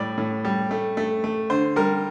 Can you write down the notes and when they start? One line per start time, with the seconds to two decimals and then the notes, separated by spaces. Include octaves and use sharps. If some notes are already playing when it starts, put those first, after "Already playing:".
Already playing: A2 G3 D5
0.17 A2
0.45 G3
0.71 A3
0.97 A3
1.24 A3
1.50 D3 C5
1.76 G3 A#4